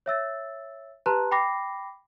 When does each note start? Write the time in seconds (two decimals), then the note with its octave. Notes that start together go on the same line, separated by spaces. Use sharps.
0.06 C#5 E5 E6 A6
1.06 G4 B4 A5 A#5 C6 F#6
1.31 G5 B5 D6 A#6 C7